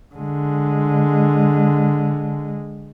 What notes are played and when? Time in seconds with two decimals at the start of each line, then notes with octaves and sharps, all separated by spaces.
0.15 D3 G#3